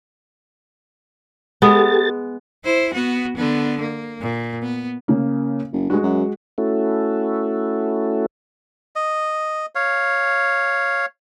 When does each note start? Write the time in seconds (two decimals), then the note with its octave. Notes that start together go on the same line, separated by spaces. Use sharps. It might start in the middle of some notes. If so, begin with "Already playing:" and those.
1.62 G#3 B3 G4 A4 A6
2.65 E4 C5
2.94 B3 F#4
3.36 D3 B3
3.81 A#3
4.21 A#2
4.62 B3
5.08 C#3 A#3
5.72 F#1
5.90 G2 G#3 F#4
6.03 F#2
6.58 A3 C#4 E4 F#4 A4
8.96 D#5
9.75 C#5 F5